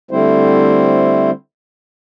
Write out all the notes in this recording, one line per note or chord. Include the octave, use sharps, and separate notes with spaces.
D3 G3 A3 C4 E4 C5